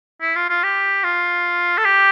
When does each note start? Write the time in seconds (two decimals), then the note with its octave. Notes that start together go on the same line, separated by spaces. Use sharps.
0.22 E4
0.36 F4
0.49 F4
0.63 G4
1.04 F4
1.78 A4
1.85 G4